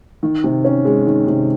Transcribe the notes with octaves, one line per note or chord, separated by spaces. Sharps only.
D#3
C3
C#4
G#3
D#3
C3